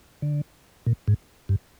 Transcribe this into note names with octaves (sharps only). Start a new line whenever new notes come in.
D3
A#2
G#2
G2